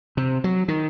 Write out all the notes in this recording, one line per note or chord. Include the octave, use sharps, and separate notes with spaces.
C3
F#3
D#3